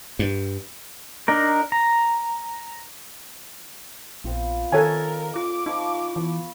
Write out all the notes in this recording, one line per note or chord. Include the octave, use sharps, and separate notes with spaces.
G2
D4 D#4 A#4
A#5
A#1 B3 C4 F4
D#3 C4 D#4 A4 A#4 C#5 G#5
F4 D6
F3 D#4 B5 C#6
E3 B3